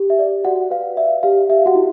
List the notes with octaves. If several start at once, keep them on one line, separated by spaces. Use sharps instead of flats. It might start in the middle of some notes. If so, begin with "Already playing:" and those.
Already playing: G4
E5
D5
F#4 D5 F#5
B4 F5
D5 E5
G4 F5
G4 E5
F#4 F#5
E4